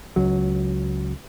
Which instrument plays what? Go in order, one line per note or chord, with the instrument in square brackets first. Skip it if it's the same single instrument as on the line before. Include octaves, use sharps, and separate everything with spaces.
[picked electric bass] C#2 F#3